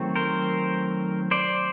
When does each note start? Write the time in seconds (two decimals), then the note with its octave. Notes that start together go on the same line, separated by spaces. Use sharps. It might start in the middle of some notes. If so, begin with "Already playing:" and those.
Already playing: D#3 F#3 A3 C4
0.15 A#4 C5
1.31 C5 D5